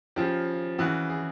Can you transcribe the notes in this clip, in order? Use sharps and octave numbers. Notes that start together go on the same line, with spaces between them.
C#3 F3 G4
C#3 E3 F#4
G#4